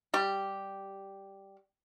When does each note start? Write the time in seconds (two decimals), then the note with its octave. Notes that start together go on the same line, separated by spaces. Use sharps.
0.14 G3 G4